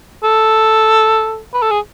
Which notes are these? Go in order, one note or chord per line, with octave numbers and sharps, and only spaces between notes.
A4
B4
A4
G#4